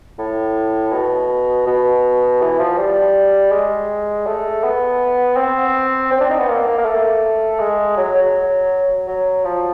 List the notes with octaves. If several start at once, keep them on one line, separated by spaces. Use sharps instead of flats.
A2
B2
B2
E3
F3
G3
G#3
A3
B3
C4
C4
D4
D#4
B3
A#3
A#3
A#3
A3
G#3
F#3
F#3
F#3
F3